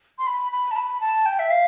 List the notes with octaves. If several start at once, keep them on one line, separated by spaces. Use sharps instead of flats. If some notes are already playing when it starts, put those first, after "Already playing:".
C6
B5
B5
A5
B5
A5
G5
E5
F5